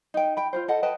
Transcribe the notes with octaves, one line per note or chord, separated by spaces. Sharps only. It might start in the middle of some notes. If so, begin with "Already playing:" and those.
D#4 G5
G5 B5
F4 F#4 C5
A4 D#5 F#5
B4 D#5 G5 A5